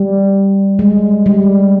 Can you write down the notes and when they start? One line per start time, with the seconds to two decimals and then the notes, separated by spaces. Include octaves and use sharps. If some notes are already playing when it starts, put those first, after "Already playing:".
Already playing: G3
0.79 G#3
1.26 G3